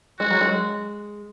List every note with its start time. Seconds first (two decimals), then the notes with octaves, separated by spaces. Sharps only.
0.19 G#3 F#4
0.31 F#3
0.41 G#3